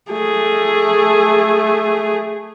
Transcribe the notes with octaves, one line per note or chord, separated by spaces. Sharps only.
A3 G#4